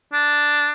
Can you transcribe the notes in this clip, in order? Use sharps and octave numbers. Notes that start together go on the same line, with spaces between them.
D4